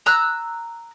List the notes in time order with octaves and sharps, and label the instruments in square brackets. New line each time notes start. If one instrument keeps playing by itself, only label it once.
[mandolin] A#5 E6 F#6